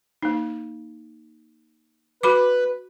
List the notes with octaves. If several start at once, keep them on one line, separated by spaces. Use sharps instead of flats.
A#3 D#4
F#4 B4 B5 D6